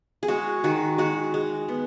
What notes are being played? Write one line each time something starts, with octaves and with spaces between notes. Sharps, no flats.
G#4
G#3 F#4
D#3 F#4
G#3 F#4
G#3
B3